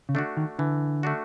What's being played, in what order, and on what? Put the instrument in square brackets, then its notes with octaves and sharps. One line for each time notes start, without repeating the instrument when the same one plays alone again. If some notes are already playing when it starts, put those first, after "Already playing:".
[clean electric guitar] C#3
[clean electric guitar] D3 [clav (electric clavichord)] A3 D4 F#4
[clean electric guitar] D#3
[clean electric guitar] D3 [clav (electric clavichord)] E3
[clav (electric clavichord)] A3 D4 F#4